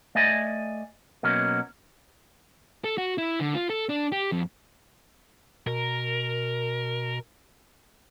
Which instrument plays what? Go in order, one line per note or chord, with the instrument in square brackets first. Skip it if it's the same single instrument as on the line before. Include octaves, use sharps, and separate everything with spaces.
[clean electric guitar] A3 D5 D#5 G#5
B2 F#3 A#3 C#4
[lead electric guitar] A4
F#4
E4
D3
F4
A4
D4
G4
F2
[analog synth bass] B2 [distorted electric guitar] A#4